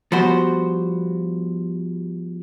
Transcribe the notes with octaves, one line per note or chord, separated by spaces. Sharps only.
F3 G3 B3 F#4 C5